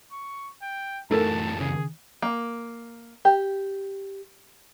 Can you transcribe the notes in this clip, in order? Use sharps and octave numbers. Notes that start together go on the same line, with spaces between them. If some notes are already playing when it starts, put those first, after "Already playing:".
C#6
G5
F#2 E3 A3 D#4 A4 A#4 A5
C#3 G#4
A#3
G4